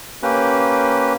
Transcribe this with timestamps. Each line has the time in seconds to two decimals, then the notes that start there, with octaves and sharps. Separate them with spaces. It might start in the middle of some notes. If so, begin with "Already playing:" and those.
0.23 A#3 C#4 G4 B4